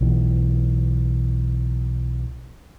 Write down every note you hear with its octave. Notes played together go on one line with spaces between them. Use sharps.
B1 E3